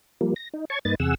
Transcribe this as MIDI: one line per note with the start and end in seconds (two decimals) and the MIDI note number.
0.21 0.34 53
0.21 0.34 55
0.21 0.34 58
0.36 0.49 94
0.54 0.65 63
0.70 0.79 73
0.70 0.79 81
0.70 0.79 85
0.70 0.79 92
0.85 0.95 43
0.85 0.95 58
0.85 0.95 63
0.85 0.95 71
0.85 0.95 93
1.00 1.14 40
1.00 1.14 48
1.00 1.14 68
1.00 1.14 78
1.00 1.14 88